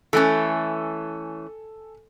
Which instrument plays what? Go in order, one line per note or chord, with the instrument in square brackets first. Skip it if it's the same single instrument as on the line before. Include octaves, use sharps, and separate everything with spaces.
[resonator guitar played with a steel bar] E3 A3 C#4 [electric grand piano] A4 G#5